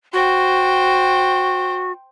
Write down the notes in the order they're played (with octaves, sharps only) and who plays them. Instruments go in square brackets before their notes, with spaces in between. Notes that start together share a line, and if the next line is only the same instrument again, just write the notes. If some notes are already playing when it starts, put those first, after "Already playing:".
[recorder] F#4 [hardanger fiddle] C5 G5